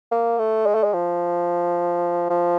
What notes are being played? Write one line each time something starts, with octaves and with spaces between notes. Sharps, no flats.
A#3
A3
G#3
A3
G#3
F3
F3